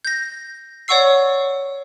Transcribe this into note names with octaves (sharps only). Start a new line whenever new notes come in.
G6 A#6
C#5 D5 F#5 C#6 E6 C7